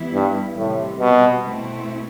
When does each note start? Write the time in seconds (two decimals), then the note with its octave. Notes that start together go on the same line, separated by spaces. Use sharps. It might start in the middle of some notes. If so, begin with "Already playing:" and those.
Already playing: E3 G3 B3 E4
0.13 G2
0.56 A2 C3 D#3 G3
1.00 B2
1.43 B2 A3 C4 E4